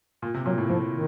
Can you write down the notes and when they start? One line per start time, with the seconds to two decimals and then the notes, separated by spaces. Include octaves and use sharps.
0.22 A#2
0.34 C3
0.46 A#2 F#3
0.58 A2
0.69 A2 F3
0.92 D#3